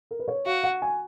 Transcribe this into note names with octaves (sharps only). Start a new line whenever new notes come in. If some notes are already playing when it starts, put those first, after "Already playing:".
A#4
B4
C#5
F#4 F5
F#5
G#5